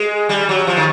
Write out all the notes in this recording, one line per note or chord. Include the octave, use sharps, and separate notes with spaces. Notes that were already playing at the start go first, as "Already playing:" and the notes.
Already playing: G#3
G3
F#3
F3
D#3